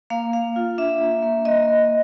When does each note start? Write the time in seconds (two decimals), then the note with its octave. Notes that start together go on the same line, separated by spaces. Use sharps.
0.10 A#3 F5
0.33 A#3 F5
0.56 F4
0.78 D4 E5
1.01 A#3
1.23 A#3
1.45 A#3 D#5
1.68 A#3